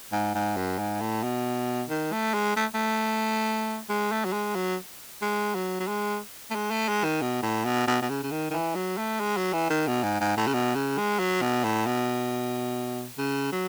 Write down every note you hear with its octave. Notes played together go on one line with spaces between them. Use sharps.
G#2
G#2
F#2
G#2
A2
B2
D#3
A3
G#3
A3
A3
G#3
A3
F#3
G#3
F#3
G#3
F#3
F#3
G#3
A3
G#3
A3
G#3
D#3
B2
A2
B2
B2
B2
C#3
C#3
D#3
D#3
E3
F#3
A3
G#3
F#3
E3
D#3
B2
G#2
G#2
A2
C#3
B2
C#3
G#3
F#3
B2
A2
B2
C#3
F#3